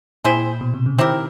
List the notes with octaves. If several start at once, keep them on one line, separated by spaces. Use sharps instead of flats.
A#2 C4 E4 G#4 C5
B2
C3
C#3
D#3 C4 E4 G4 A#4